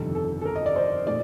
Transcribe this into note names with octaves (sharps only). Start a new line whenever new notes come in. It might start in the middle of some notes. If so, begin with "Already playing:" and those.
Already playing: G1 F2 C3 D#3 G3 A4
A4
A4
A#4
D#5
D5
C5
A#2 A3 D5